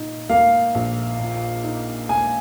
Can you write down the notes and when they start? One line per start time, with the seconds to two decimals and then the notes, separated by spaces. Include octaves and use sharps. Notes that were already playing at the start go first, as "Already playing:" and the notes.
Already playing: A#2 D#4
0.30 A#3 F5
0.75 A#1
1.19 A#2
1.64 D#4
2.09 A#3 G#5